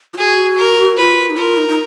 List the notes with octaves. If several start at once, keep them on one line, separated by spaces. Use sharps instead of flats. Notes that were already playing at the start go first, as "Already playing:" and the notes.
F4
F#4 G#4
A#4
F4 B4
D#4
F4 A#4
D#4
D#4